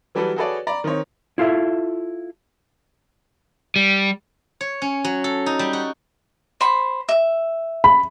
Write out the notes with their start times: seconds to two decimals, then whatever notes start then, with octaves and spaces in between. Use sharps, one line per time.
0.15 E3 F#3 G3 A4 B4
0.36 F#4 G#4 A4 B4 C#5 D5
0.67 D5 A#5 B5
0.84 D#3 C4 D#4 C#5
1.38 E4 F4 A4 E5
3.76 G3
4.61 C#5
4.82 C#4
5.04 F#3
5.24 A4
5.46 D#4
5.59 G3
5.73 F#4
6.61 C5 B5 C#6
7.09 E5
7.84 B5